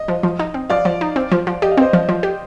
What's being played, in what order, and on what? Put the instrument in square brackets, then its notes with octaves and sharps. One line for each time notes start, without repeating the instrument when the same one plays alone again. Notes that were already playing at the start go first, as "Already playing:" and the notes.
Already playing: [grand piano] D#5
[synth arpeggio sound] F3
F3
D#4
C4
[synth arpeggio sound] F3 [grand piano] D5 F5
[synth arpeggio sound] F3
D#4
C4
F3
F3
[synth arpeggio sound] G4 [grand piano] D#5
[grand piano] F5
[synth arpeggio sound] C4 [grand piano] C5 D#5
[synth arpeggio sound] F3
F3
G4